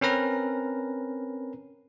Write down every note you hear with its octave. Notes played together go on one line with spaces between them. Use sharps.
C4 C#4 A#4 B4 A#5